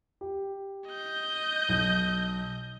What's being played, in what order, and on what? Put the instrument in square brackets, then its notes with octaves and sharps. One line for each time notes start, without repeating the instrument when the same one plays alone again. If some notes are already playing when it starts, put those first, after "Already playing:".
[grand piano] G4
[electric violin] D#5 G6
[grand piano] B1